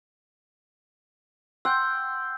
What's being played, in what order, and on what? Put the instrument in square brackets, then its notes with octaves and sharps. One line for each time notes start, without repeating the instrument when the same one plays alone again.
[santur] F#5 G5 C6 [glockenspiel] E6 G6